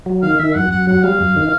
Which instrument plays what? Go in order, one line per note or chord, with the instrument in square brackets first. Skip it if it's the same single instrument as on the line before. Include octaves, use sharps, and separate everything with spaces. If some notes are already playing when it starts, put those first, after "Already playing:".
[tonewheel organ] F#3
[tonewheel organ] D#3 [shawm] F5
[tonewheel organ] D#3 [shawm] E5
[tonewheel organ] F#2 [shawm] F#5
[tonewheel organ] F#2 [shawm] F#5
[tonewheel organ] F#3 [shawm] F#5
[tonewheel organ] G3 [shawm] F5
[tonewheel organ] F#2
D#3